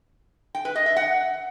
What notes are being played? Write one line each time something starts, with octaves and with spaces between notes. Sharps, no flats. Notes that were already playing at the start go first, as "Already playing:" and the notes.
G5
B4
D#5
E5
F#5